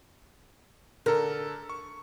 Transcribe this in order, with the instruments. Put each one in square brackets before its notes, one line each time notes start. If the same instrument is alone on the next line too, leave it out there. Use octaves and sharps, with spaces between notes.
[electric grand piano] D3 A4 [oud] A#4
[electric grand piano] C#6